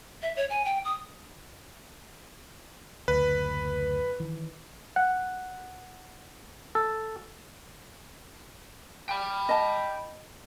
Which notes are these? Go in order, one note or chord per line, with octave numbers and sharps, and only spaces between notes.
E5
C#5
G#5
G5
D#6
F#1 D2 B4
D#3 E3
F#5
A4
G5 B5
D#5 A5